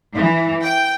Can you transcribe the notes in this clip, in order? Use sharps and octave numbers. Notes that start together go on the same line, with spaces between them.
E3
G5